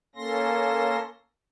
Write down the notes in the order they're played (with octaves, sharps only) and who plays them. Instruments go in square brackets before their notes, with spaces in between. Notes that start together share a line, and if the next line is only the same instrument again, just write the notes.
[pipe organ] A#3 C#4 A4 C6 A#6